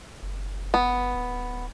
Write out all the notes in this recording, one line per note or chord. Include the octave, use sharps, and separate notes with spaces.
F#1
B3
D1